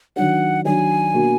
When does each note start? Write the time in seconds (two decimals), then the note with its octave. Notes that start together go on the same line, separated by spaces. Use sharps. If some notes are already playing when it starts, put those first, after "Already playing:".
0.16 D#3 F#3 D4 F#5
0.65 D#3 F#3 D4 G#5
1.14 B2 A#3 D4 F#4